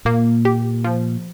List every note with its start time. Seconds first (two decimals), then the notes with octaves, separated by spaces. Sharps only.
0.05 A#2 A#3
0.45 G4
0.84 F3